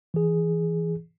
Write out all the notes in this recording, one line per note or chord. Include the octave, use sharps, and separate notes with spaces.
E3 G#4